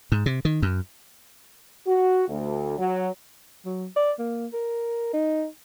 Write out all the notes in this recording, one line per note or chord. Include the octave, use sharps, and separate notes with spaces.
G#2
C3
D#3
F#2
F#4
D2
F#3
F#3
D5
A#3
A#4
D#4